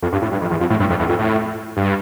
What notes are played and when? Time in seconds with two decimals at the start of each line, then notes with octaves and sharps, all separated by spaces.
0.02 F2
0.12 G2
0.22 A2
0.32 G2
0.41 F2
0.51 E2
0.61 F2
0.70 A2
0.80 G2
0.90 F2
0.99 E2
1.09 F2
1.19 A2
1.77 G2